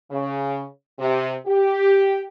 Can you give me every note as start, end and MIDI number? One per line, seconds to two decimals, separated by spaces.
0.11 0.64 49
0.98 1.33 48
1.46 2.24 67